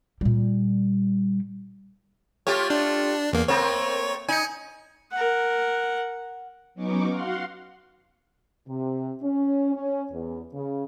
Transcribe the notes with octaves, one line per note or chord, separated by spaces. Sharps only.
A#2 G3
A3 F4 G4 C#5
D4
E2 A#3
A3 A#3 C4 C#5
D#4 G#5 C#7
A#4 F#5
F#3 B3 C#4 D#4 C#6 D6
F#4 F5 F#5 C6
C3
C#4
C#4
E2
C#3